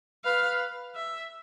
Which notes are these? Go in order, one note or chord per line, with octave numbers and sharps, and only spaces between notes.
B4 F5
E5